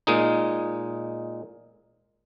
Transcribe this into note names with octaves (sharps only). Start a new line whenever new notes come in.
A#2 G#3 D#4